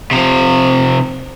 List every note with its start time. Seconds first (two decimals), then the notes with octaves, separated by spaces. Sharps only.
0.11 C3 F3